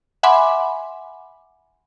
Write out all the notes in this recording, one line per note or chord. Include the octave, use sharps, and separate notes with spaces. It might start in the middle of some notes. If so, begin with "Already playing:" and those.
E5 F#5 G#5 B5 C6 D6